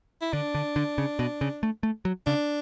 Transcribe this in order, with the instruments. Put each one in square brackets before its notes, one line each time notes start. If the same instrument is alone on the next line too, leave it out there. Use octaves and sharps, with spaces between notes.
[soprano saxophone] E4
[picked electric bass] D3 [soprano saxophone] D4
[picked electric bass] D3
D3
C#3
B2
C#3
A3
A3
F#3
[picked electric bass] C#3 [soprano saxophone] D4